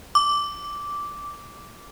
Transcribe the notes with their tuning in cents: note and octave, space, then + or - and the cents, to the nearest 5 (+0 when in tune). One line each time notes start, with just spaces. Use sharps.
D6 -10